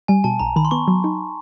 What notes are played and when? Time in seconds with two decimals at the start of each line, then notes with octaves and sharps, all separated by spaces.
0.08 G3 G#5
0.24 B2 A5
0.39 B1 A#5
0.56 D#3 B5
0.65 C6
0.71 B3 C#6
0.88 F#3
1.04 D#4